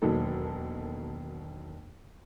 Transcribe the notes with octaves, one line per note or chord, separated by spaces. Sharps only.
E1 D#2 B2 F#3 D#4 A4